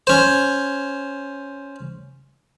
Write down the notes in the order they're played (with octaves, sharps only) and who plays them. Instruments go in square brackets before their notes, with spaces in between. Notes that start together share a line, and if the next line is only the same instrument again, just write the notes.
[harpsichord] C#4 C5